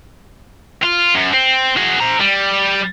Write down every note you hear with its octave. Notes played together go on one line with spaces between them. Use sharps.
F4
F#2
C4
F#4 G#4
C5 A#5
G3